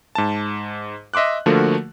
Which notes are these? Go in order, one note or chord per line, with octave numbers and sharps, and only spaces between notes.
G#2 A5
D#5 E5 C6 D6 F#6
D3 F3 A3 A#3 F#4 A#4